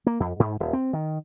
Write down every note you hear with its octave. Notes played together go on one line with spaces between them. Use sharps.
A#3
F2
G#2
D#1
C4
D#3